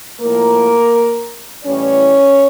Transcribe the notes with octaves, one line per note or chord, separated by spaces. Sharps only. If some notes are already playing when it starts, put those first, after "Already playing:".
A2 F3 A#3 A#4
A2 E3 G3 C#4 C#5